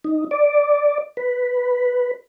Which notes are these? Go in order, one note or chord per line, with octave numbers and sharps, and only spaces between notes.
D#4
D5
B4